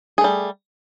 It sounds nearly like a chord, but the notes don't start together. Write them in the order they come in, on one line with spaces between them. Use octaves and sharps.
G#4 A3 G3